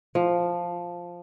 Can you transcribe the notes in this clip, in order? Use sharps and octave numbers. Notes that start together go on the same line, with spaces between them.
F3